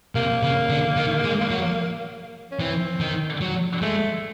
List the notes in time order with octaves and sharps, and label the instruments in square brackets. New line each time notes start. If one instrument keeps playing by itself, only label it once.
[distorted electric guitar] C3 [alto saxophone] A#3
[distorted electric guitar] C#3
D3
D#3
G#3
F#3
[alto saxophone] C#4
[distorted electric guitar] E3 [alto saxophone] C4
[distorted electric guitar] D#3
F#3
[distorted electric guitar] G#3 [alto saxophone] A3